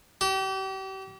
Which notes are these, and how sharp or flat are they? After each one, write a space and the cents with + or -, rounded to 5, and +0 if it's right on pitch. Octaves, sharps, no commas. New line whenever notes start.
G4 -35